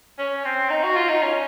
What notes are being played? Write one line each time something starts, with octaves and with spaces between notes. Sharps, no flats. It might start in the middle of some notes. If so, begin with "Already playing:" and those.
C#4
C4
D#4
F#4
F4
D#4
C#4